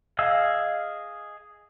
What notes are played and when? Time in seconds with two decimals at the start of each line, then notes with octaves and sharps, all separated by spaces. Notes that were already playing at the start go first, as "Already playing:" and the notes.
0.19 G#4 D#5 F5 E6